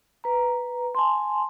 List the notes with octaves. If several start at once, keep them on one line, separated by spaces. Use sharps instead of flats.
B4 A#5
G#5 A5 C6